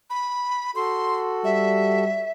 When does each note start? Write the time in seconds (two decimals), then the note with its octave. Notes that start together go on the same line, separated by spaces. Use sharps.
0.10 B5
0.76 F#4 A4 C6
1.44 G3 E5